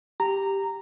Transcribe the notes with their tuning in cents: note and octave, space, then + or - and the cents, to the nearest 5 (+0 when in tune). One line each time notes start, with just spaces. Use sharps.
G4 +0 A#5 -10